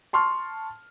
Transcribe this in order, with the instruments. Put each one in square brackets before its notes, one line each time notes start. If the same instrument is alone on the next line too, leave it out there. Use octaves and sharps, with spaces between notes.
[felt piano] A5 C6 C#6 F6